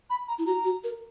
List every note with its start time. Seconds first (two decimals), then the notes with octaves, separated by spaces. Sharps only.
0.10 B5
0.28 A#5
0.39 E4
0.46 F#4 A#5
0.65 F#4
0.84 A#4